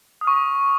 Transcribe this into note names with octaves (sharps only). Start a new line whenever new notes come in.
C#6 D#6 F6